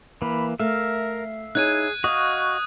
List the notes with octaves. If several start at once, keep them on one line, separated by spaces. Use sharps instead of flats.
E3 A#3 B5
A3 A#4 E5 F5
D#4 E4 G#4 C#5 F#6 G#6 D#7
F#4 D#5 F5 C#6 D#6